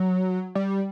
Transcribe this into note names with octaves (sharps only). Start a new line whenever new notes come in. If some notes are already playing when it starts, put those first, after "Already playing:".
Already playing: F#3
G3